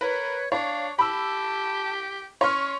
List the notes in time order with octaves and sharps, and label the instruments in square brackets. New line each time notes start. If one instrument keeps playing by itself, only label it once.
[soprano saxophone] A#4 [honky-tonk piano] B4 [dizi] C#5
[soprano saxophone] D4 [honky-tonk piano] C#5 [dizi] F5
[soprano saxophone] G4 [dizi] A5 [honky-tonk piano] B5 E6
[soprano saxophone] C#4 [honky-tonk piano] C#5 C6 F6 [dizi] C#6